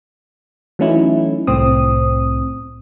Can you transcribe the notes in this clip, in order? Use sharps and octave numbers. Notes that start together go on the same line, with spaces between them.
E3 F#3 A3 C#4 D#4 E4
C2 A2 C4 D#6